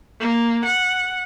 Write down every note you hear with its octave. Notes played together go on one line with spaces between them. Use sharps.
A#3
F#5